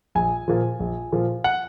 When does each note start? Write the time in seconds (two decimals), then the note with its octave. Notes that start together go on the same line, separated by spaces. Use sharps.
0.15 A#1 G#5
0.48 A#2 F3
0.80 A#1
1.12 A#2 F3
1.44 F#5